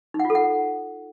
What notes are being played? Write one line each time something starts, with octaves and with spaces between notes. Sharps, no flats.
D#4
F#5
F4
A4
F#5